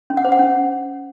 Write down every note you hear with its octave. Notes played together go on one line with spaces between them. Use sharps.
C#4
F#5
C5
F#5
C#4